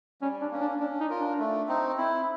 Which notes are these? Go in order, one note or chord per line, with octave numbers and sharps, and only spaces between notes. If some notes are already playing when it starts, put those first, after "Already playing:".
G3 C#4
D4
A#3 C#4
D4
C#4 D4
D#4
F4 A#4
D4
A3
C4 D#4
C4 E4